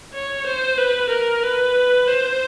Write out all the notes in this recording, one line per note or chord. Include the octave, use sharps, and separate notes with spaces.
C#5
C5
B4
A#4
B4
C5